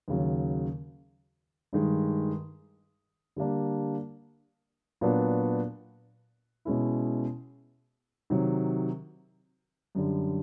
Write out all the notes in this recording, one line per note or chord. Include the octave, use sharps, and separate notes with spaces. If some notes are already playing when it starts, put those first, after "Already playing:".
D#2 C#3 F#3
G2 D#3 G#3
D3 G3 A#3 D4
A#2 F#3 B3 D4 F#4
B2 G#3 C#4 E4
C3 D#3 F#3
F#2 D3 G3